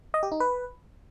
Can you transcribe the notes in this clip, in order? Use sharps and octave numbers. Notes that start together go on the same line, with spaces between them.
D#5
G4
D#4
B4